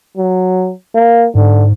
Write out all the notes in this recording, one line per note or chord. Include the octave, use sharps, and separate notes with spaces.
F#3
A#3
G#2 D3